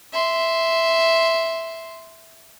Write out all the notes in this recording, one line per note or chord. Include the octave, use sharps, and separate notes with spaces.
E5 C6